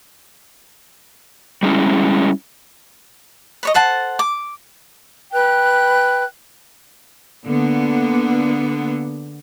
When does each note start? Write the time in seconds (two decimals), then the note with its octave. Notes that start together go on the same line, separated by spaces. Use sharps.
1.63 G3 G#3 C#4 E4
3.63 B4 C#5 D#5
3.74 A4 C5 F#5 A5
4.19 D6
5.33 B4 G5 F#6
7.47 D3 A#3 B3